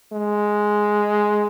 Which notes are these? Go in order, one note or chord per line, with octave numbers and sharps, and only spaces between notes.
G#3